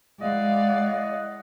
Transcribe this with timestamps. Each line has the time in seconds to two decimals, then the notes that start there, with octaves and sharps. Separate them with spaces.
0.21 G#3 E4 D5 D#5 F5 F#5